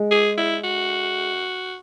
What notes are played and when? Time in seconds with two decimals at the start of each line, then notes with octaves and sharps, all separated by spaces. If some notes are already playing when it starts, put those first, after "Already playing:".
Already playing: G#3
0.11 G#4
0.38 E4
0.64 F#4